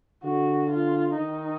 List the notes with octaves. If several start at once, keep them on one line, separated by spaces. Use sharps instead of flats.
D3 F#4
F4
D#3 D#4